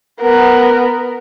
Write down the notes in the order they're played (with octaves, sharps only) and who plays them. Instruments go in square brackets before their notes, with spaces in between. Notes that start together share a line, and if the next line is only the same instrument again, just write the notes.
[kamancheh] B3 A#4